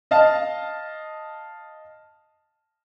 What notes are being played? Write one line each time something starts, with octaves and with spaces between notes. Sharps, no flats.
D#5 F5 A5